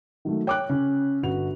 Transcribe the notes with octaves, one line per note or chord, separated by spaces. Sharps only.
D#3 F#3 A3
C#5 G5 D6 F#6
C#3 C#4
G1 F#4 F7